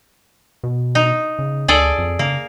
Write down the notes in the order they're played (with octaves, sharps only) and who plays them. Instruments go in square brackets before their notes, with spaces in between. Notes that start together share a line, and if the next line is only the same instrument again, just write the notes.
[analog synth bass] B2
[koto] D#4
[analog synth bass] C#3
[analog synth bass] D2 [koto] G#4 A4 D5
[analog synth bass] F2
[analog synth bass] C#3 [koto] A#3